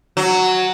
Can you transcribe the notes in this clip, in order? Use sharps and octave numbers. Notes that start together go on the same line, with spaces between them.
F#3